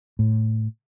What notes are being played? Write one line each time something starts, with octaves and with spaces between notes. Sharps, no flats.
A2